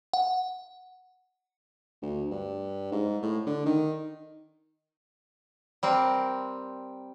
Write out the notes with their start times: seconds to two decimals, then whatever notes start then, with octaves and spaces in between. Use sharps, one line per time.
0.13 F#5
2.02 D2
2.31 G2
2.92 G#2
3.22 A2
3.47 D3
3.66 D#3
5.83 G3 C4 A#4